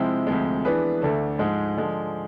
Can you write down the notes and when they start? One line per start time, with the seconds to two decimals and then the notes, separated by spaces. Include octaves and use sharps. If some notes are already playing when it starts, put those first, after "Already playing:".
Already playing: C3 F3 G#3 C4 E4
0.27 D2 C3 F3 G#3
0.65 E3 B3 D4 G#4 B4
1.02 D2 D3 A3
1.39 G#2 F3 G#3
1.76 D3 F3 G#3